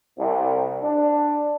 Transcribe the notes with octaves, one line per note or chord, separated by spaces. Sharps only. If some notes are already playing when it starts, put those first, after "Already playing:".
C2
D4